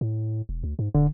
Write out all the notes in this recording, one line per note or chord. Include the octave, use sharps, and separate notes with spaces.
A2
E1
D2
G#2
D1 D3